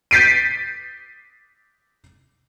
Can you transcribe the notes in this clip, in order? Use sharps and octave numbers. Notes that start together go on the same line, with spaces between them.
G6 A6 B6 C7 D7 D#7